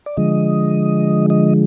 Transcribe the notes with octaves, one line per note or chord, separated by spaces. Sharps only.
D5
D3 F3 G#3 D#5
D#5